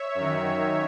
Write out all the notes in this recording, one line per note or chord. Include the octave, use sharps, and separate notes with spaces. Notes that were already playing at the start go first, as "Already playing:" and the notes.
Already playing: C#5 E5
F#2
D#3